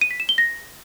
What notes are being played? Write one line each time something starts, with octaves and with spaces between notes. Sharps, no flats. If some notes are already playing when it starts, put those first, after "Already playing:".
D#7
B6
E7
G7
A#6